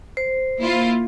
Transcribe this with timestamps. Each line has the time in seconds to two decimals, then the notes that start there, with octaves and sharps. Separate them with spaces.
0.17 C5
0.59 A#3 E4 F4